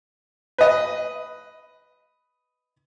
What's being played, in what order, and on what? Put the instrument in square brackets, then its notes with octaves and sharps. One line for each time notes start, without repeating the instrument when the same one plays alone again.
[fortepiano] B4 D#5